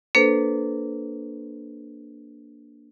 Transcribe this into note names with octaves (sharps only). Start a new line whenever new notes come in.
A#3 D4 A4 B4 C5